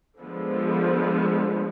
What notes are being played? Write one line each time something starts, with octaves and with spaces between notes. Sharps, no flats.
D3 F3 G#3 B3